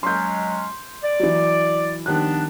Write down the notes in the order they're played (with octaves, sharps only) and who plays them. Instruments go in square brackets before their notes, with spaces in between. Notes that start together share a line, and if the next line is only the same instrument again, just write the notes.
[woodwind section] F#3 G#3 C#4 [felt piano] C6 G6
[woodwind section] D5
[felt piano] E3 F#3
[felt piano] D#3 G3 F#6 [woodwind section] F3 B3 D4